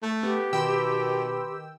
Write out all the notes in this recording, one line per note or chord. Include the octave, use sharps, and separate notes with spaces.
A3
B3 G4
B2 D#3 B4 G5 B5 C6 E6